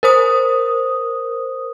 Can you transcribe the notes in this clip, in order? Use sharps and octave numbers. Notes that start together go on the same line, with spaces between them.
A#4 C5 D#6